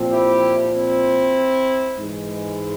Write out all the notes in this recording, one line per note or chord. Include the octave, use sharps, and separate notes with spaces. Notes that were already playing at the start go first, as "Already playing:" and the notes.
Already playing: A#2 F3 C4
E4 G4
C4 E4
G#2 E3 G#3